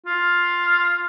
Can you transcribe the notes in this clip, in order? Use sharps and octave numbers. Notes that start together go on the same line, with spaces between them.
F4